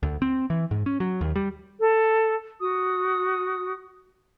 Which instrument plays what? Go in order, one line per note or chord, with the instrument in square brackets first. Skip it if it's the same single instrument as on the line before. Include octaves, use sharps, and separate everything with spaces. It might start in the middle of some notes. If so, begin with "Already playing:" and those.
[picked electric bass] D2
C4
E3
G#2
C#4
F#3
D#2
G3
[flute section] A4
F#4 D#6